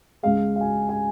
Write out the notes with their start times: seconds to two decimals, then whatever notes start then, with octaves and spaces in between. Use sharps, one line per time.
0.23 C#2 C#3 G#3 F5
0.56 F5
0.61 G#5
0.89 G#5